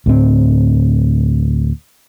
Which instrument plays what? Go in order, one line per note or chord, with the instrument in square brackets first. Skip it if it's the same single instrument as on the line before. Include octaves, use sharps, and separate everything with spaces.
[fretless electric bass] D2 A2 C4